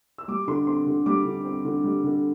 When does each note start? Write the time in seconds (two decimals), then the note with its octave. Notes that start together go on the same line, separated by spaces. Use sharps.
0.18 E6
0.28 G3 D6
0.47 D3 C6
0.67 C4 C6
0.87 D3
1.06 G3 D6
1.25 D3
1.45 C4
1.65 D3
1.84 G3
2.04 D3